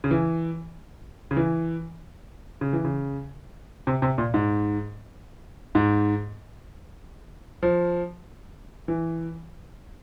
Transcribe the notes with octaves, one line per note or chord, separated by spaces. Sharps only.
C#3
E3
C#3
E3
C#3
E3
C#3
C3
C3
A#2
G#2
G#2
F3
E3